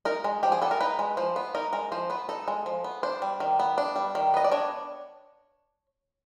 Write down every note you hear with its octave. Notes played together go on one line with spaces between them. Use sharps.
D#4 A#4
G#3
F3 G4
G#4
B3 A4
A#4
D#4 B4
G#3
F3 C5
B3
D#4 A#4
G#3 A#4
F3 C5
B3 B4
D#4 A4
G#3
F3
B3
D4 C5
G3
D#3
B3
D4
G3
D#3
B3 D#5
D5
D4 C#5